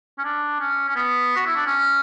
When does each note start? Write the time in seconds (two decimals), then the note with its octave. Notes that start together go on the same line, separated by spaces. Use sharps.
0.19 C#4
0.24 D4
0.60 C#4
0.89 C#4
0.96 B3
1.36 F#4
1.46 E4
1.56 D4
1.66 C#4